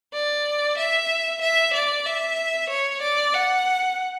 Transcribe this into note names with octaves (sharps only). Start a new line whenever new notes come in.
D5
E5
E5
D5
E5
C#5
D5
F#5